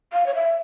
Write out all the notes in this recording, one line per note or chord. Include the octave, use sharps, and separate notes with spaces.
F5
C#5
E5